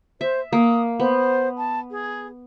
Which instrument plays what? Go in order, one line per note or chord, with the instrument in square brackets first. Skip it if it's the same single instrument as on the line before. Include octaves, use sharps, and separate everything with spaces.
[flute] C5 [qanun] E5
[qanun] A#3 [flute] D#6
[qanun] B3 [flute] C5
[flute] A5
G#4